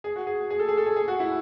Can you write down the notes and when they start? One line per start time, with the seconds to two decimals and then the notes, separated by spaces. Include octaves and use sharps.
0.04 G#4
0.16 F#4
0.27 G#4
0.50 G#4
0.59 A4
0.68 G#4
0.77 A4
0.86 G#4
0.96 G#4
1.08 F#4
1.20 E4